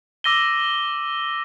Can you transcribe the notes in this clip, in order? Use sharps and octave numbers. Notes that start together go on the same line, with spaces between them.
D6 E6 A#6 D#7 G7